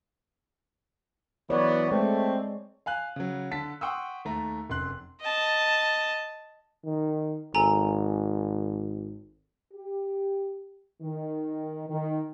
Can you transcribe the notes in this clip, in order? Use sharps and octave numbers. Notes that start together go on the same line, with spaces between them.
E3 F#3 B3 C#5 D5
G#3 A3 C4
F5 G#5 F#6
C#3 F#3
D3 A5 B6
F#5 G5 C6 C#6 D#6 E6
D#2 A3 A#5
F1 F#2 C6 F#6
D#5 A5
D#3
G#1 A4 G#5 A#5
G4
D#3
D#3